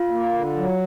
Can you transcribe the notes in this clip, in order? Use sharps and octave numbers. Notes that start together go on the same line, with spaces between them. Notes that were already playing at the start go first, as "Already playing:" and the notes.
Already playing: F4
A#3
D3
F#3